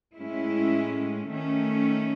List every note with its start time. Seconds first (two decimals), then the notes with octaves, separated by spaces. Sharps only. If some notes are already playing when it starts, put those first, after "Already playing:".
0.15 A2 G#3 C#4 E4
1.28 D#3 A3 C#4